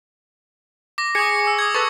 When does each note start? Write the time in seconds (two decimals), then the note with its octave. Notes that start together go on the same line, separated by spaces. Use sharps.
0.98 D6 A#6
1.15 G#4 C#6 C#7
1.30 C#7
1.47 E6
1.59 D#6 G#6
1.74 A4 B4 C#6